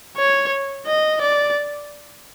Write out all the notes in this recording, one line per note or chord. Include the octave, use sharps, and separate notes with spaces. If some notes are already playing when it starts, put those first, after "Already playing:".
C#5
D#5
D5